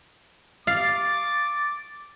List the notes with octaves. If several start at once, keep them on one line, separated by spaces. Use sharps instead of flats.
F5 D6 A6